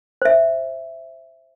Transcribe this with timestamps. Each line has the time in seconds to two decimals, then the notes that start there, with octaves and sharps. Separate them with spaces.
0.22 C5 E5